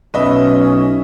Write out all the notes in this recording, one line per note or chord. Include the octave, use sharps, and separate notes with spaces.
B1 C#4 B4 D#5 E5